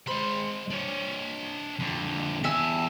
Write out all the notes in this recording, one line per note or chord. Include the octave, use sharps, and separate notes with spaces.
G#3 C5 B5
D4 C#5
F2 D3
E2 E5 G#5 A5 E6